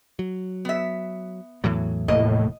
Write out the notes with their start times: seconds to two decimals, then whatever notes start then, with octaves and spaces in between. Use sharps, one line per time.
0.19 F#3
0.65 B3 E5
1.64 E2 A2 E3 F#3
2.08 F1 A2 A#3 D#5